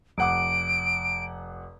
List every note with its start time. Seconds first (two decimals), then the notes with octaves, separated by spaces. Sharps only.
0.18 F1 F#5 D6 D7